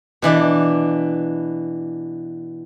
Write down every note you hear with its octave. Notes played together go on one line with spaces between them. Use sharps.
B2 E3 D4